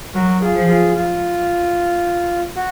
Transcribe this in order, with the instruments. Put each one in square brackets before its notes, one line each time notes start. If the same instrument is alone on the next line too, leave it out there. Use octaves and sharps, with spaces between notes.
[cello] F#3 [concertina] F#4 A#4
[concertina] F4 G#4
[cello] F3
[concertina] F4 G#4
F4
F#4